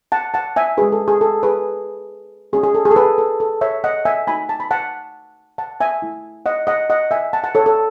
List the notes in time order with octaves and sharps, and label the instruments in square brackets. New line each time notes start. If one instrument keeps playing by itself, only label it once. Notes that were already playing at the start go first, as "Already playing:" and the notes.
[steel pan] F#5 A5
F#5 A5
E5 G#5
G#3 C#4 F#4 G#4 B4
A4
G#4
A4
G#4 B4
A3 C#4 F#4 G#4
G#4
A4
G#4
A4
G#4 B4
A4
A4
C#5 E5
D#5 F#5
E5 G#5
A3 D#4 F#4 G#5 B5
A5
B5
F#5 A5
F#5 A5
E5 G#5
A3 E4
D#5 F#5
D#5 F#5
D#5 F#5
E5 G#5
F#5 A5
F#5 A5
A4 C#5
A4